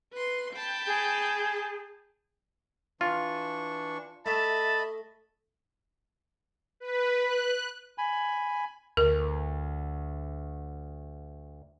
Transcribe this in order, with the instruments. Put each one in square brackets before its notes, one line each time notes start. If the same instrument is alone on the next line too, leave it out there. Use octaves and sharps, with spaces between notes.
[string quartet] B4 C6
G5 A5 B5
[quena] G#4
[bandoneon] E3 D4 C#6 [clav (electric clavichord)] F4
[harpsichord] A3 [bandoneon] D#5 E5 B5 [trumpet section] A5
[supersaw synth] B4
F#6
[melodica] G#5 B5
[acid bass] D2 [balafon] A#4